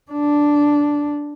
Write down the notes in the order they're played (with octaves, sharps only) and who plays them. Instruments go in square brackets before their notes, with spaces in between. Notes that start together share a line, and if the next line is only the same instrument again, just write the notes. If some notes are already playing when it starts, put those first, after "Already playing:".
[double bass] D4